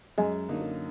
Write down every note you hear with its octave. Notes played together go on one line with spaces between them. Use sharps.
F#2 G#3
D3 F#3 A#3 D#4